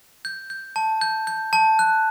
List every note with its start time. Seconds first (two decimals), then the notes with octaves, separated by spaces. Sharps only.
0.25 G6
0.50 G6
0.76 A5
1.01 G6
1.27 G6
1.53 A5
1.79 F#6